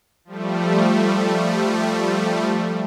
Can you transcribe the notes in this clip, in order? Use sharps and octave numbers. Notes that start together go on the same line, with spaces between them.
F3 G3 A3